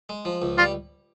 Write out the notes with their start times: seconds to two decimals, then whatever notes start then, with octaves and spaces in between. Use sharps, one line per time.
0.09 G#3
0.25 F3
0.42 C#2
0.58 G3 F4